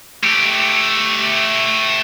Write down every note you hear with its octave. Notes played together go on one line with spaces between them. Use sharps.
A3 G4